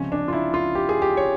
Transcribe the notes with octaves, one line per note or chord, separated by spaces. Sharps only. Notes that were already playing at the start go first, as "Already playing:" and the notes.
Already playing: C#2 C3 F3 C#4
D4
F4
E4
F4
G4
G#4
G4
C#5